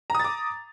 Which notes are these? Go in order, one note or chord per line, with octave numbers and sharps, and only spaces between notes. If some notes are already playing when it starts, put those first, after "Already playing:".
A#5 D6 D#6 A6